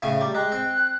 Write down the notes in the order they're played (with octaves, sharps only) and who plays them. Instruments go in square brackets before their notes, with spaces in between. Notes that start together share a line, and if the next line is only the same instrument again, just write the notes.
[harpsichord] A2 C#3 G#5
[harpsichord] G3 [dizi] A#5
[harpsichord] G#3 [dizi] G5 [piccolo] F#6
[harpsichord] C4